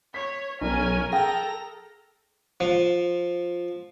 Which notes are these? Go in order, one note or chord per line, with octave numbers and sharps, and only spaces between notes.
C#5 B6
B1 C#4 A#4 G#5
G#4 A4 G5 A#5 A#6
F3